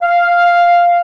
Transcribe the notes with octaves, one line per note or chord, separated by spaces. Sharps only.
F5